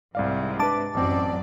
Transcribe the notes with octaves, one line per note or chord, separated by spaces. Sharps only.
C2 G#2 C3 D5 F5
D4 B4 A5 D6
A1 F#2 F#3 C4 D5